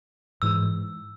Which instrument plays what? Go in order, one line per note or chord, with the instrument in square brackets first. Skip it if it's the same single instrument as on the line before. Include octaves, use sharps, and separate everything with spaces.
[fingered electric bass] G#2 E3 G#3 [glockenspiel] E6